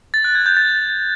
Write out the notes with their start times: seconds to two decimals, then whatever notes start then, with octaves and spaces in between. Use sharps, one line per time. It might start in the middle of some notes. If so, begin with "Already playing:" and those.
0.14 A6
0.24 F#6
0.35 G#6
0.46 G6
0.57 A6